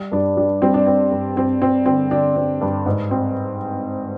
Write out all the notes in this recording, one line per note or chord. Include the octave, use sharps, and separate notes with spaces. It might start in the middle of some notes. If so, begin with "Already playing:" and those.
Already playing: G3
G2 D4
G3 D4
G3 C4
D4
C4
G2
G2 C4
C4
D3 C4
D3 D4
C4
G2
G#2
C4